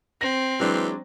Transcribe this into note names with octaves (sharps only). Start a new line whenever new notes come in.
C4 A#6
E3 F#3 G#3 D4